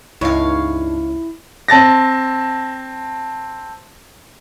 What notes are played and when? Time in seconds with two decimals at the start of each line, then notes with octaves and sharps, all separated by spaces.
0.21 C#2 G2 D#4 E4 C#5 F5
1.68 C4 A5 A6 A#6